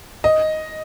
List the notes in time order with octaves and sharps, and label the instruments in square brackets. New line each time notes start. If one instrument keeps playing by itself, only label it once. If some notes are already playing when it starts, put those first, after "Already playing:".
[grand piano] D#5